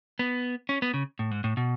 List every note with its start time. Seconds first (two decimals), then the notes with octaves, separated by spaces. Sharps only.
0.19 B3
0.69 C#4
0.82 B3
0.94 C#3
1.19 A2
1.31 G#2
1.44 A2
1.57 B2